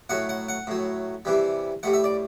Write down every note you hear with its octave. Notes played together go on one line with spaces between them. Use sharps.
A2 F#3 F#5
F#5
F#5
A2 F#3
C3 E3 G3
A2 G3 F#5
E5
D5